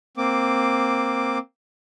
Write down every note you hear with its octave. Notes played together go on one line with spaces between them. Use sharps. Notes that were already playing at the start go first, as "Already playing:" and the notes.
A#3 C4 D6